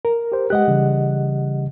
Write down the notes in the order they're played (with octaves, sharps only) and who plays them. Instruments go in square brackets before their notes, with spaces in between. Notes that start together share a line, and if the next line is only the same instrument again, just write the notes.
[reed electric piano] A#4
[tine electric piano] G4 C5
[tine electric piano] G#3 B4 F#6 [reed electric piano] G4 D#5 F#5
[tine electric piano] C#3 E3 G3